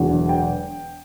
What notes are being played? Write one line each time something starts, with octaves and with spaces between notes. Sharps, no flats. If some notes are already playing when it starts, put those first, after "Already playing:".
Already playing: E1 E2 D3 F#3
G5